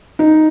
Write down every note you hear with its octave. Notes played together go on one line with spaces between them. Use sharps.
D#4